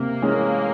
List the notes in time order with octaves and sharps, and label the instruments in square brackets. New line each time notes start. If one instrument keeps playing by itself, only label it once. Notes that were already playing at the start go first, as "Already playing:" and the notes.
Already playing: [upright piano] C3 [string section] A#3
[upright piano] E3 G#3 C#4